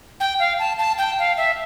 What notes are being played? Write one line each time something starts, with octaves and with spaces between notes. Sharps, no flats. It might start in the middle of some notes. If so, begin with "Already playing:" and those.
G5
F5
A5
A5
G5
F5
E5